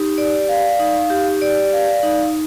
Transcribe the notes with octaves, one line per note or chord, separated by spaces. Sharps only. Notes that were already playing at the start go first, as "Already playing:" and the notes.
Already playing: D#4 G4
D5
F5
D#4
G4
D5
F5
D#4